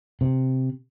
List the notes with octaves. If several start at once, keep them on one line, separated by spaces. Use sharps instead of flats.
C3